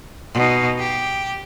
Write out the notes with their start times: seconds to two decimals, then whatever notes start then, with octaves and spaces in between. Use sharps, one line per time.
0.34 B2 D#4
0.79 G4